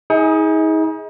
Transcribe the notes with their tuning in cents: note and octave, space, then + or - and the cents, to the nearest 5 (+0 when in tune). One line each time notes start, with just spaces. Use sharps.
D#4 +40 G#4 +0